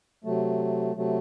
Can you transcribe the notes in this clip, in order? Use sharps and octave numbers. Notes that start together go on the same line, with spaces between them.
C3 F#3 A3
C3 F#3 A3